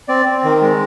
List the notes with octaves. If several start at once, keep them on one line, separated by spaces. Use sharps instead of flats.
C4 D5
C4
D#3
G#3